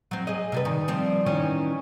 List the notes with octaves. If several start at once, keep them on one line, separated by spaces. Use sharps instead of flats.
F#3 C4
G#4 D#5
C3 G3 B4
D#3
F3 G3 C4
D#3 E3 C#4